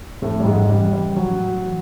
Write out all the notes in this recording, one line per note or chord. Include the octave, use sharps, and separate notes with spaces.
F2 A2 A3
G3
G#2 G#3
C#3 E3 G3
G3
A2 F#3
E3